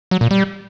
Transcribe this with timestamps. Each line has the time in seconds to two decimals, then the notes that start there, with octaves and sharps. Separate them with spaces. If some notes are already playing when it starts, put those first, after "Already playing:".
0.11 F#3
0.21 A#2
0.31 G3